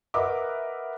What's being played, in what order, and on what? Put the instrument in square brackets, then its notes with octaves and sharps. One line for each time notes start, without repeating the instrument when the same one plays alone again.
[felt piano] A#4 B4 D#5 E5 F#5 D6